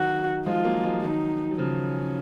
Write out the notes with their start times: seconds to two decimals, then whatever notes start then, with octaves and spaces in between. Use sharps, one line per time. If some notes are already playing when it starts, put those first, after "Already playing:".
Already playing: D#3 F#3 F#4
0.46 F3 G#3 F4
0.64 F#3 A#3
0.83 F3 G#3
0.93 F3
1.02 D#3 F#3 D#4
1.51 F#3
1.58 C#3 F3 C#4